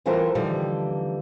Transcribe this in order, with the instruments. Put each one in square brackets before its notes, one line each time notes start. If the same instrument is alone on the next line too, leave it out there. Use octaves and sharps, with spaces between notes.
[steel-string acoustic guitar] E3 G3 F4 A4 A#4 C5
D#2 D3 E3 F3 G3